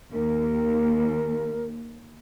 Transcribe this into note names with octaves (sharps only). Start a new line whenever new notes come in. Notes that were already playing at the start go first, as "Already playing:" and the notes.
D#2 A#4